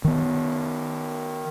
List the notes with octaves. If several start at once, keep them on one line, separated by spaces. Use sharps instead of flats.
D#3 B3